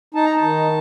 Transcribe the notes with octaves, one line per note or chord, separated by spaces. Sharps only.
D#4 A5
A#5
A5
D#3